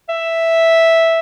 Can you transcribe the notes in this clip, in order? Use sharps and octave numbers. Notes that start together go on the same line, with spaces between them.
E5